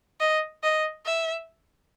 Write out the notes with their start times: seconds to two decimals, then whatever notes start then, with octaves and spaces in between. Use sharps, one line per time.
0.20 D#5
0.63 D#5
1.05 E5